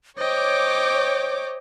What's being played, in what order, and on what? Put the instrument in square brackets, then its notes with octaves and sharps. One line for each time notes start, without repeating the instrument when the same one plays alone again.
[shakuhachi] C5 [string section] C#5 D6 [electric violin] D#5 G5